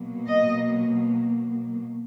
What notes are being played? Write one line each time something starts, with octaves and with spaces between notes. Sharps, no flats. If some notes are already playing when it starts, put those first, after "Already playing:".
Already playing: B2 F#3 A#3
D#5